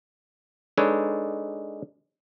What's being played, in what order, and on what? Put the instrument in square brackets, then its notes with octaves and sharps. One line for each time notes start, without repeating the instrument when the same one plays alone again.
[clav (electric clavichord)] G#3 D4 D#4 A4 B4 C#5